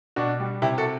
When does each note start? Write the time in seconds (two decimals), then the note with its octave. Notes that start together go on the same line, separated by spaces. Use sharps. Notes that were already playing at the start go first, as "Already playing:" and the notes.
0.16 B2 D4 F#4
0.40 G3
0.62 C3 E4 G4
0.78 F#4 A4